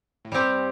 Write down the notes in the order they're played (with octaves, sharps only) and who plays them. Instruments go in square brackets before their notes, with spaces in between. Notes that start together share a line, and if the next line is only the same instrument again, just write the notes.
[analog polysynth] A2
[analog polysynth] G2 [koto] G3 C4 G4